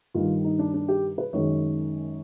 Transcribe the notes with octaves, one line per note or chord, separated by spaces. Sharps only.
G2 D#3 G3 F4
D#4
D4
D4
G4
B4
F#2 D#3 G#3 C#5